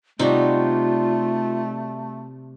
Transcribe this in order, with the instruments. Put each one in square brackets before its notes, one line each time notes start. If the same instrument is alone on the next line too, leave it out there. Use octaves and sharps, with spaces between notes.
[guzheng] C3 F#4 [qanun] G3 D#4 [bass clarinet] A3 [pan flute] F4